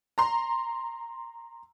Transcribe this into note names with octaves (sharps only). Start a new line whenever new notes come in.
A#5 C6